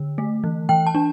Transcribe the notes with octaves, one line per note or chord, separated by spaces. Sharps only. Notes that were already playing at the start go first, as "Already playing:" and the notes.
Already playing: D3
A3
E3
E3 G5
A5
D4